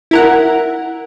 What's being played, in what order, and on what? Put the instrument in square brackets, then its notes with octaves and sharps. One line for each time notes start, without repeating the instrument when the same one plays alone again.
[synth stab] E4 A#4 F#5